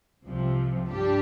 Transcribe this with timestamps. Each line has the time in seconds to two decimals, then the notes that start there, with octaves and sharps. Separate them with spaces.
0.25 C2 C3 F3
0.88 G2 G3 D4 G4